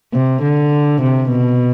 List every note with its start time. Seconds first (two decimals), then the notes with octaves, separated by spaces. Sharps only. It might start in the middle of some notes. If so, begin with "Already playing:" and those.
0.13 C3
0.42 D3
1.01 C3
1.31 B2